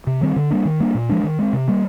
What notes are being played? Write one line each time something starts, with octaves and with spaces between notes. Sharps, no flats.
C3
D#3 G3 C4
D3
G3 A#3 D4
D#3
G3 A#3 D4
A#2
F3 G#3 D4
D#3
G#3 C4
C3
G3 A#3